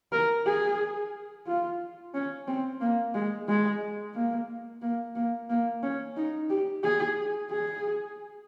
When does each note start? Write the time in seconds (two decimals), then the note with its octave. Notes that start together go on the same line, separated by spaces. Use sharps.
0.12 A#4
0.46 G#4
1.47 F4
2.14 C#4
2.47 C4
2.81 A#3
3.14 G#3
3.48 G#3
4.14 A#3
4.82 A#3
5.15 A#3
5.49 A#3
5.83 C#4
6.16 D#4
6.50 G4
6.83 G#4
7.50 G#4